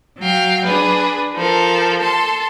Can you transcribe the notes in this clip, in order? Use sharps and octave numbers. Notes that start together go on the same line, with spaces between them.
F#3 F5 G5
D4 G#4 B4
F3 A4 A#4
A4 A5 C6